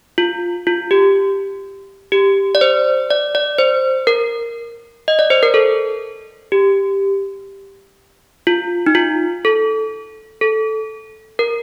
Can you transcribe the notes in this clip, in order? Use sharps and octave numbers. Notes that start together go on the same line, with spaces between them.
F4
F4
G4
G4
D5
C5
D5
D5
C5
A#4
D#5
D5
C5
A#4
A4
G4
F4
D#4
F4
A4
A4
A#4